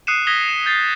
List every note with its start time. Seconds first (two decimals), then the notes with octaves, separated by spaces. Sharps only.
0.07 D#6 F#6 C7 C#7 D#7 E7
0.27 D#6 G#6 A#6 B6 G7
0.49 E7
0.66 G6 A6 C7